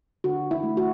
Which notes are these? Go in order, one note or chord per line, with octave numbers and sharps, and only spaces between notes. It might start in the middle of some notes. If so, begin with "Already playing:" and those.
D3 F#4
E4
A3
F#4